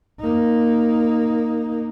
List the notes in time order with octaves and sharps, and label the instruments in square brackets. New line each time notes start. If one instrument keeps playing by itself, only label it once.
[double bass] A#3 D#4